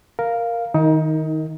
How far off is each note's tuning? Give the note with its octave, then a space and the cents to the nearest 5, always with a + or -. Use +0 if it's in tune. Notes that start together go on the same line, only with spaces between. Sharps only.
A#4 +0 F5 +0
D#3 +0 D#4 +25 A#4 -10